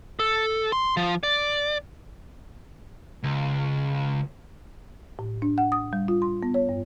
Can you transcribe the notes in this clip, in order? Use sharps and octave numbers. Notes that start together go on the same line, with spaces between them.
A4
C6
F3
D5
C#2
A2
D4
F#5
D#6
G3
F4
C6
B3
C#5
G2